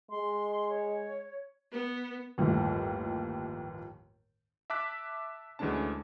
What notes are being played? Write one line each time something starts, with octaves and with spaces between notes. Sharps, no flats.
G#3 C6
C#5
B3
G1 D#2 A2 E3 F3
E5 A5 D6 F#6 B6
D2 E3 G#3 C#4 D4 A5